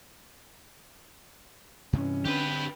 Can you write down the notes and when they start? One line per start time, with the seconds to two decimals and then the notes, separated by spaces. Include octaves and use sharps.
1.93 G2 C3 E3 C#4
2.25 D3 C4 D4 G4 B4